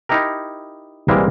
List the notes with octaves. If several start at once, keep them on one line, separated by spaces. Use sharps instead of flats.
D#4 E4 G4 A#4
C2 A#2 E3 G3 G#3 A#3